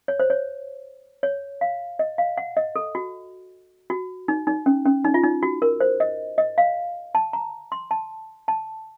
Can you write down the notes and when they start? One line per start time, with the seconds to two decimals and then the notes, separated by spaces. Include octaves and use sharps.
0.08 C#5
0.20 C5
0.30 C#5
1.23 C#5
1.61 F5
1.99 D#5
2.18 F5
2.38 F#5
2.57 D#5
2.76 A4
2.95 F#4
3.90 F#4
4.28 D#4
4.47 D#4
4.66 C#4
4.86 C#4
5.04 D#4
5.14 F4
5.24 D#4
5.43 F#4
5.62 A#4
5.80 C5
6.00 D#5
6.38 D#5
6.58 F5
7.15 A5
7.33 A#5
7.72 C6
7.91 A5
8.48 A5